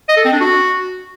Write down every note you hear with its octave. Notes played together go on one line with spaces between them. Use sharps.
D#5
A4
C4
D4
F#4